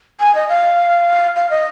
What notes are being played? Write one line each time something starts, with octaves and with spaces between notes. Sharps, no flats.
G#5
D#5
F5
F5
D#5